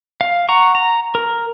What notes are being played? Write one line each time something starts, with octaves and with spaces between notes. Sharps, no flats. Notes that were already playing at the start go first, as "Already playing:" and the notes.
F5
F#5 A#5 C#6
A#5
A#4